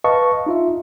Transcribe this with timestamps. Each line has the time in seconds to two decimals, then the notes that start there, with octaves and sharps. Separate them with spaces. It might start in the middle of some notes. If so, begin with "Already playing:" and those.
0.04 B4 D#5 F5 A5 C#6
0.46 D#4 F4 E5